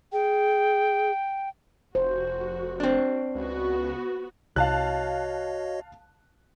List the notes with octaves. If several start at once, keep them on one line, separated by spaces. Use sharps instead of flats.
G#4 G5
F1 F#4 C5
C4 D4
C#2 B3 F#4
C2 F#4 C#5 D#5 F5 A5 F#6